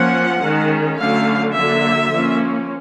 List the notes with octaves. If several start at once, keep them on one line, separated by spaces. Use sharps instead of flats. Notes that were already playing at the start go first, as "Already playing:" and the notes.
Already playing: F3 A#3 C#4 F#5
D#3 G#3 C#4
D3 F#3 A3 C#4 F5
D3 F#3 A#3 E5
F3 A#3 C#4